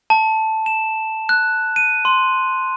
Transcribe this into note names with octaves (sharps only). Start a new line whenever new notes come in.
A5
E7
F#6
D#7
C6